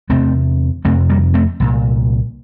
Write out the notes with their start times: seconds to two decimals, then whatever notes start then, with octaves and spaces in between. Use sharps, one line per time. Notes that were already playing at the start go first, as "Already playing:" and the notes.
0.09 E2 C3 A3 C4
0.85 F2 C3 A3 C4
1.10 G3 A#3
1.34 A3 C4
1.60 C2 A#2